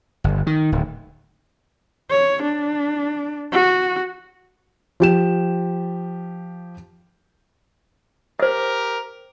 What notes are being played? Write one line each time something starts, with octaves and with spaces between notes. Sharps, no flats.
G1
D#3
D1
C#5
D4
F#4
F3 G4 E7
G4 A#4 C5 E5